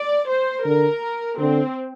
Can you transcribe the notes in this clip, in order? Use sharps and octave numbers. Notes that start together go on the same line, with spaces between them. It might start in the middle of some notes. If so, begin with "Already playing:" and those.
Already playing: D5
C5
D3 A#4
D3 C4